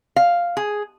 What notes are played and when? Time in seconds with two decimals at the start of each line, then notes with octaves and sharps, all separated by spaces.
0.16 F5
0.57 G#4